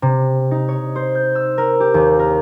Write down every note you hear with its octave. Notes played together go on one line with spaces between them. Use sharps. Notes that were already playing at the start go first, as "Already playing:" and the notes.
C3
D#4
C#5
C5
G6
E6
A#4
G4
D#2
A#4